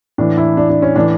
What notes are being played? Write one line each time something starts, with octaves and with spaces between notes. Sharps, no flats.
A2 E3 D4
E4
D4
D4
C#4
A2 E3 D4